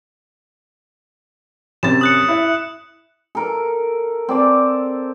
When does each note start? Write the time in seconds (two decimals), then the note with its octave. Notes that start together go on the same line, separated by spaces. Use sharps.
1.83 F#2 C3 A6 E7
2.01 D#6 F#6 C#7
2.28 E4 E5
3.35 A4 A#4
4.29 C4 D5 A5